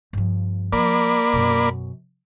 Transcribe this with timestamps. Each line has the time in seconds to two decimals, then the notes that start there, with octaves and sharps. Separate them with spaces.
0.13 G2 F3
0.73 F3 A#3 D5 B5
1.33 F#2 B2